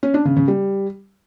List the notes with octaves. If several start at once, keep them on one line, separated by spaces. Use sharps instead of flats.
C#4
D4
C#3
C#3
G3